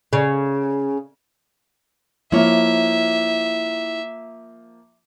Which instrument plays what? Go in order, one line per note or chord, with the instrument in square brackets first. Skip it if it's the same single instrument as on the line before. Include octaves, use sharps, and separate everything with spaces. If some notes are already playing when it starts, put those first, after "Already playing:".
[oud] C#3
[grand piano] F3 A#3 [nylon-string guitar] E4 C#5 [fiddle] E5